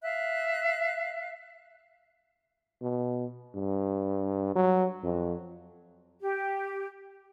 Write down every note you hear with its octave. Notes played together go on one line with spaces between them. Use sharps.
E5 F5 F#6
B2
G2
F#3
F2
G4